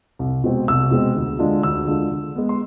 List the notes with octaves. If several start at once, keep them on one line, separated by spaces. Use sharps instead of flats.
C2
B2 G#3 C4
C2 E6
B2 G#3 C4
D2
D3 G#3 D4 F4
D2 E6
D3 G#3 D4 F4
D3
G#3 B3
C6